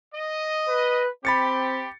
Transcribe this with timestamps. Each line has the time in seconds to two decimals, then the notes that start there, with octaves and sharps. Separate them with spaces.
0.15 D#5
0.68 B4
1.25 C4 G4 B5 A6 C#7